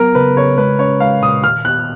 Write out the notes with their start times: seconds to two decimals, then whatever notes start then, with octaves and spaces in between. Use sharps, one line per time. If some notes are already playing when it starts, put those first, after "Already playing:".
Already playing: F#3 B3 A#4
0.15 C#3 B4
0.36 C#3 C#5
0.58 G#3 B4
0.79 C#4 C#5
1.00 G#3 F5
1.22 A#2 D#6
1.44 D#3 F6
1.65 B3 F#6